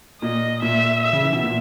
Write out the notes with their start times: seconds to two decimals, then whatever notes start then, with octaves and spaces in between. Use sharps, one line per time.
0.21 A#2 D#5
0.62 A#2 E5
1.03 E5
1.13 C#3
1.23 E3
1.33 B2
1.44 A#2